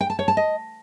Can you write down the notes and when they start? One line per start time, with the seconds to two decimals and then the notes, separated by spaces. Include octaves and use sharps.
0.01 G5
0.10 A5
0.19 C#5
0.28 A5
0.37 D#5